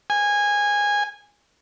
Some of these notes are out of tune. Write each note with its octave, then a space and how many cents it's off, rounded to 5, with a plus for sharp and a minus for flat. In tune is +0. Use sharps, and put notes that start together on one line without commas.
G#5 -15